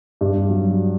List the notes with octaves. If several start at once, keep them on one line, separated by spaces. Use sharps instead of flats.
G2
F#3